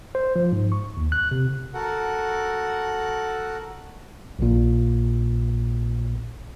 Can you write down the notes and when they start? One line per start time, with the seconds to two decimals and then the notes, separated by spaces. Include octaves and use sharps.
0.15 C5
0.36 F3
0.52 G#2
0.72 C#6
0.97 D#2
1.12 F#6
1.31 C3
1.74 F#4 A4 A#4 F#5
4.39 A#1 A#2